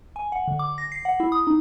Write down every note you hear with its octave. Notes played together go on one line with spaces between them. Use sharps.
G#5
F#5
D3
D6
A#6
C7
F#5
E4
D#6
D#4